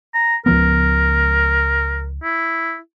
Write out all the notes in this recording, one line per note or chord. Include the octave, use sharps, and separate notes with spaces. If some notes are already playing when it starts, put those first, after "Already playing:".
A#5
C#2 F3 B3 A#4
E4